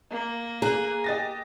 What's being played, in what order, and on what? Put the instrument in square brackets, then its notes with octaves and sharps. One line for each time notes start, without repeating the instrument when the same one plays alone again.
[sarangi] A#3
[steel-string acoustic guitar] G#4 [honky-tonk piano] A#5 F#6
[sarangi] G4 [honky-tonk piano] D#5 A6 A#6